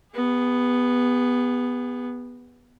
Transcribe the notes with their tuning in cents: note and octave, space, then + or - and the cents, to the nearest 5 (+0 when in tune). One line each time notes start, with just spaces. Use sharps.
B3 +0 G#4 -45